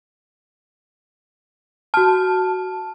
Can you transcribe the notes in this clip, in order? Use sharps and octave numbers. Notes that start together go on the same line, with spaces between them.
F#4 A5 F6